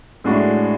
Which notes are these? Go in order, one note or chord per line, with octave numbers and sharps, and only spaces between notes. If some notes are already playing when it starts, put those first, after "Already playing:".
A2 G#3 D4 F#4